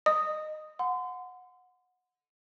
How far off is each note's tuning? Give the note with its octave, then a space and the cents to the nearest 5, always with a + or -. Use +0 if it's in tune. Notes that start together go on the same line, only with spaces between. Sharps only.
D#5 -15 D#6 -5
F#5 -20 C6 -35